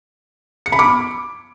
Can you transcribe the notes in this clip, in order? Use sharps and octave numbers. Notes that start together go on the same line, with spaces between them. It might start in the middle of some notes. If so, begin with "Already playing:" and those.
C#7
B5
D6